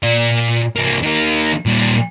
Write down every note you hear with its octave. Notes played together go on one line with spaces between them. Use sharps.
A#2 D5
C2 A#3
D#3 A#3
A#2 G3